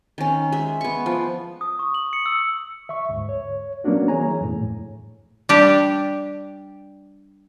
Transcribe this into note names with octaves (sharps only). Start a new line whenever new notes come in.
D#3 C#4
G#3 E5
B3 C#6
F3
D#6
C#6
F#7
C#7
E6
E5 C#6
D2 G#2
C#5
F#3 A#3 B3 C#4 D4 F#4
E3 G#4 C#5 G#5 A#5
F2 A2
G3 D4 G4